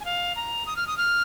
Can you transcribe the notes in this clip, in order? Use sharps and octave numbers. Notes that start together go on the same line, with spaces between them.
G#5
F5
A#5
D#6
F6
D#6
F6